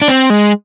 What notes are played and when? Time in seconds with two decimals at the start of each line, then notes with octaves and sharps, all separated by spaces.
0.02 D4
0.08 C4
0.30 G#3